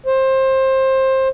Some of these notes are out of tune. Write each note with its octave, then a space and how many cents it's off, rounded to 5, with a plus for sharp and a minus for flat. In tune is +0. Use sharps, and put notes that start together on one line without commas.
C5 +20